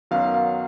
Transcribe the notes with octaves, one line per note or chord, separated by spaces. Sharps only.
F#2 D#3 F#3 B3 F5
F5